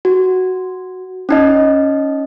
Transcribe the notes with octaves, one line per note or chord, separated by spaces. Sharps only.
F#4
C#4 D#4 D#5